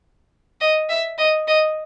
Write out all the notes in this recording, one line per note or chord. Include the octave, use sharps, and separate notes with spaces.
D#5
E5
D#5
D#5